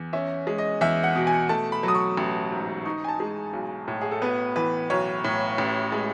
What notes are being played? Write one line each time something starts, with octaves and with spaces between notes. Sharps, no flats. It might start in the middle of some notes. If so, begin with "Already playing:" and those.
Already playing: E2
C#4 E5
G#3
D#5
E2 E5
F#5
B2
G#5
A3 A5
B5
F#3
D#6
C#6
A1
G#2
D#4 C#6
G#5
A5
G#3
B1
A2
G#4
A4
B3 B4
E3 B4
B1 C#5
A2
A1
G#3